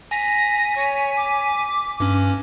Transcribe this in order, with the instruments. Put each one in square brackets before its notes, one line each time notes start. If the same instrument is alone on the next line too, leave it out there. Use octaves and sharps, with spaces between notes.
[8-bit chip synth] G#5 B6 [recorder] A#6
[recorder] C#5
D6
[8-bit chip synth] G2 C#4